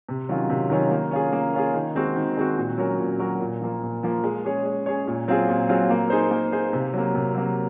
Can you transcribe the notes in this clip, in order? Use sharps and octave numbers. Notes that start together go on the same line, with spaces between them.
C3
D#3 F#3 C#4 F4
C3
D#3 F#3 C#4 F4
A#3
C#4 F4 G#4
A#3
C#4 F4 G#4
D#3
G#3 C4 F#4
D#3
G#3 C4 F#4
A#2
F#3 C#4 F#4 A#4
A#2
F#3 C#4 F#4 A#4
A#2
F3 A#3
A#2
F3 A#3
G#3
C#4 G#4 C#5
G#3
C#4 G#4 C#5
A#2
F#3 C4 F4 G#4
A#2
F#3 C4 F4 G#4
A#3
D#4 G#4 C5
A#3
D#4 G#4 C5
C3
F#3 A#3
C3
F#3 A#3